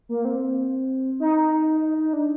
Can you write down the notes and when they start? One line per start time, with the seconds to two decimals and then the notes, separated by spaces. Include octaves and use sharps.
0.09 A#3
0.25 C4
1.20 D#4
1.82 D#4
1.98 D#4
2.13 D4